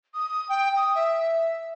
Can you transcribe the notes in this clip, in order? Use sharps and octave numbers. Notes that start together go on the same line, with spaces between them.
D#6
G5
D#6
E5